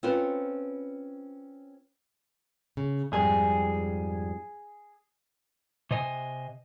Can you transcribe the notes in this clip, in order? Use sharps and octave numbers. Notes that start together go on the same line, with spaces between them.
C4 C#4 F4 A4 B4 C5
C#3
F2 G#2 G3 G#4
C3 C5 D#5 G#5